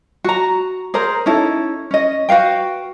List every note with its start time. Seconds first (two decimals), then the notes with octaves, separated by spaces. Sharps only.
0.24 F#4 A#5
0.94 G#4 A#4 C5 A#5
1.26 C#4 D#4 E4 A4
1.91 C#4 D#5
2.29 F#4 B4 F5 G5